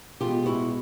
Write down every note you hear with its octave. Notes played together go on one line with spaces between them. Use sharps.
B2 G#3 B3 F4 G4
E4 F#4